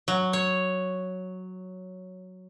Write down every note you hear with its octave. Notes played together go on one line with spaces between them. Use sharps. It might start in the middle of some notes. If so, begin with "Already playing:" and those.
F#3
C#5